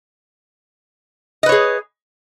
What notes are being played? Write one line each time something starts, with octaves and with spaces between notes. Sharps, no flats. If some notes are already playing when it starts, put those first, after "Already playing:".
G#4 B4 C#5 D#5